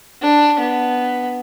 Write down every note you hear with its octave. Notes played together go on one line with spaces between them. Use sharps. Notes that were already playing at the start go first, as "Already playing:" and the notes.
D4
B3